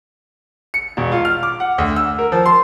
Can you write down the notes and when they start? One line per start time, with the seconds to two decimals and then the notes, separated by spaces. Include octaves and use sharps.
0.74 C#7
0.97 E1
1.12 F4
1.25 F6
1.43 D6
1.60 F#5
1.78 D2
1.96 E6
2.19 A#4
2.32 F3
2.46 C6